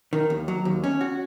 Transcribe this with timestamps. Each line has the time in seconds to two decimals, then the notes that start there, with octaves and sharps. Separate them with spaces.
0.13 D#3
0.30 D#2
0.48 F#3
0.65 D#2
0.84 C#4
1.01 F#4